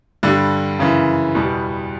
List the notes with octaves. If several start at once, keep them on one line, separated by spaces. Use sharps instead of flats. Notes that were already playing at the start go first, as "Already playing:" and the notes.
G2 D3 G3
F#2 C#3 E3
E2 B2 G3 B3